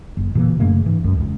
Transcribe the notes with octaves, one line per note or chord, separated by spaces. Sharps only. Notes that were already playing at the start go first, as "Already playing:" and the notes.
F#1
A#2 C#3 E3 A#3
F#2 C#3 A3 A#3
G#2 E3
C#2 F#2
C#2